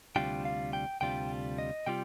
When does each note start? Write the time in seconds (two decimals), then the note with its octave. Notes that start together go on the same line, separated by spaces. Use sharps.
0.16 D2 C3 G3 D4 F4 G5
0.45 F5
0.73 G5
1.01 D2 C3 G3 D4 F4 G5
1.58 D#5
1.86 C3 G3 F4 G5